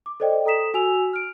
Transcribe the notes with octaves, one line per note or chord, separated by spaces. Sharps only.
D6
A4 C5 D5 D#5 G5
A4 A#5 D#6 B6 E7
F#4 G#5 E6 F7
F6 D7